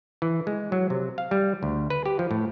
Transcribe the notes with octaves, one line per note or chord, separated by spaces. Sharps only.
E3
G#3
F#3
C3
F5
G3
D2
B4
G4
F3
A2